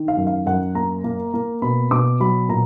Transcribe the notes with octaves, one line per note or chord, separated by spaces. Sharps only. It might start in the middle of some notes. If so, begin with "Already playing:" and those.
Already playing: D#3
F5
F#2
F5
F#2 F#5
A#3 A#5
A#3
A#3
B2 B5
B2 D6
F#3 B5
A#2 A#5